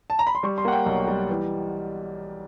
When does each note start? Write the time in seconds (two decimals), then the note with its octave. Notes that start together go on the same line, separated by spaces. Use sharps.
0.10 A5
0.19 A#5
0.27 B5
0.35 C6
0.43 G3 C#6
0.58 C6
0.65 A#3 F#5
0.72 G5
0.86 B1
1.07 G3
1.29 E3